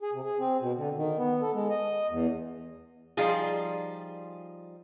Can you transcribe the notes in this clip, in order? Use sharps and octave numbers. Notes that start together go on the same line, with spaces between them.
G#4
C3
G#4
C4
B2
D3
D#3
B3
A4
G#3
D#5
E2
F3 G3 D#4 F4 G#4